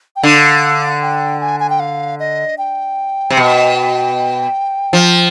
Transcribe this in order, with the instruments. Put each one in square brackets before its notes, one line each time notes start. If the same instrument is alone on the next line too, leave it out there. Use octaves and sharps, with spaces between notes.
[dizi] G5
[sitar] D3 [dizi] F5
[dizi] G5
G#5
G#5
G5
F5
D#5
G5
[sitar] C3
B2
F3